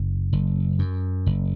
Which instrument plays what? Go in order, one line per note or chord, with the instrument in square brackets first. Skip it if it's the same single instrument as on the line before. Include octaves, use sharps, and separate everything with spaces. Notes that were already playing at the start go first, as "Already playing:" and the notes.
Already playing: [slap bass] F#1
F#1
F#2
F#1